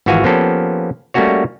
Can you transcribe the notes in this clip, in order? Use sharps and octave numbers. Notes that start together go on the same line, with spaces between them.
G#1 E3 F3 F#4 F5 G#5
F3 A#3 B3 C#4 G4 A4
G3 A3 A#3 C#4 F#4 C#5